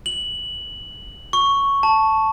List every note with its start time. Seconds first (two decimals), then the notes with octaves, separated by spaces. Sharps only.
0.06 F#7
1.33 C#6
1.83 A5